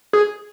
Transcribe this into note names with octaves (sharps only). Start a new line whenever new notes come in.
G#4